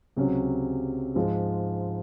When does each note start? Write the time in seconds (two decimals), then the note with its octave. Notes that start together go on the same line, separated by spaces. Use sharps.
0.16 C#2 C3 F#3 C#4
1.15 G#2 F3 G#3